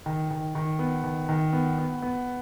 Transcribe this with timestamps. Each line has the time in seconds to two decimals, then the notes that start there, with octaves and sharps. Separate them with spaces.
0.06 D#3
0.31 D#3
0.55 D#3
0.79 B3
1.04 D#3
1.29 D#3
1.53 B3
1.78 B3
2.02 B3